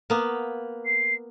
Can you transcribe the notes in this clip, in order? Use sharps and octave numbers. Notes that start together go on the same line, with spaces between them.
A#3 B3
C7